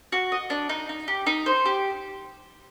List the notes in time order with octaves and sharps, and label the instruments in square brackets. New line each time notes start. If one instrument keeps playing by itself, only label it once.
[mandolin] F#4
D#5
D4
D#4
D#4
G4
D#4
C5
G4